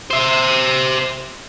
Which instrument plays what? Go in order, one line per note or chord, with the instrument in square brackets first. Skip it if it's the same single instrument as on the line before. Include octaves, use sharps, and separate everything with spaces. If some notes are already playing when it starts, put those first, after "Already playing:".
[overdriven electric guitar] C5 E5